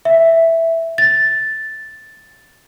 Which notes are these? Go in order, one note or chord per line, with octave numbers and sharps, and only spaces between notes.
E5
A6